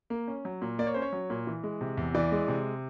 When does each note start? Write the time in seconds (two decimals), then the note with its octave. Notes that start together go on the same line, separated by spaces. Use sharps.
0.10 A#3
0.28 C#4
0.45 F#3
0.62 A#2
0.79 A#3 D5
0.87 C#5
0.94 C#4 C5
1.02 C#5
1.13 F#3
1.30 A#2
1.47 E3
1.63 G#3
1.81 C3
1.97 E2
2.15 E3 D5
2.32 G#3
2.48 C3